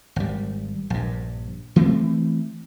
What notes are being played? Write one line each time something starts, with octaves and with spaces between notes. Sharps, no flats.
G#1 G3
A#1 G2
E3 A3 C4